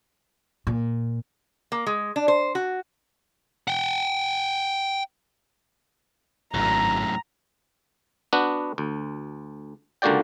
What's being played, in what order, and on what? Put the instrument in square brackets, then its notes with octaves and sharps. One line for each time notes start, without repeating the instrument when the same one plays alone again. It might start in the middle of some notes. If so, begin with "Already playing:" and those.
[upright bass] A#2
[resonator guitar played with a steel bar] A#3
G#3
D4
C5
F#4
[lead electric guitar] F#5 G5
[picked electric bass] D1 G#1 [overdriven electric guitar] F#2 A2 [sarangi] A#5
[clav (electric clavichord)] B3 D4 F#4 B4
D2
C#2 D3 A#3 F#4 D5 G5